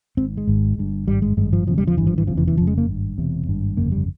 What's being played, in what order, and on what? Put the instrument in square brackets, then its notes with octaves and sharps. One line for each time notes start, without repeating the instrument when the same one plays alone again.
[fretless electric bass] G#1 G#2 C4
G#3
G#1 G#2
G1 G2
G#1 G2 G3
G#3
G#1 G2 G#3
F3
E1 E2 C#3 F3
G3
F3
G#1 G2 E3
F3
E3
F1 E2 C#3 F3
E3
E3
F1 F2 C#3 F3
G#3
A#3
G#1 G2
E1 E2 C3
G#1 G2
G1 F2 C#3 A#3
G3